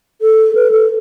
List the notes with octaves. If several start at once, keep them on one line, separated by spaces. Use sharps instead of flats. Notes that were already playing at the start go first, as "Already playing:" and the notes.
A4
B4
A4